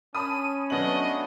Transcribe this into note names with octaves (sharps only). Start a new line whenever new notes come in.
C#4 A5 B5 D#6 D#7
F#3 A3 B3 D4 F#4 D#5 F#7